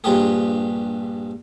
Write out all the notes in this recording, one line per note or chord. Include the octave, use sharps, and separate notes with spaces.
A#1 G2 F4 G4 G#4